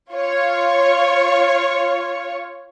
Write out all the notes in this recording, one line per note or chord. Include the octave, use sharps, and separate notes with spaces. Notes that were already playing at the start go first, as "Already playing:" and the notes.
F4 C#5